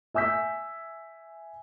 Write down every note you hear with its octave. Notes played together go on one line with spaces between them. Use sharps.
E5 G#5 E6 G6 B6